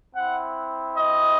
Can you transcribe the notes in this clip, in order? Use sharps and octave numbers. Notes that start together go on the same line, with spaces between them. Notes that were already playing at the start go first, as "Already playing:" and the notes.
C4 E4 F#5
D#5